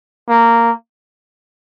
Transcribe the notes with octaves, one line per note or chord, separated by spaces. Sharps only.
A#3